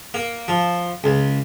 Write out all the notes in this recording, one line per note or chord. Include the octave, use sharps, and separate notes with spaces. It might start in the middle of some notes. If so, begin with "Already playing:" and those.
A#3
F3
C#2